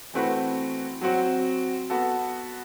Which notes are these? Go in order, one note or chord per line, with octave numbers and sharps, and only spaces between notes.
E3 A3 C4 F#4 B4
F#3 C4 F#4
B3 F#4 A4